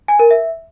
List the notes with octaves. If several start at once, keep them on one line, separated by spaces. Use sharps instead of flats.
G#5
A#4
E5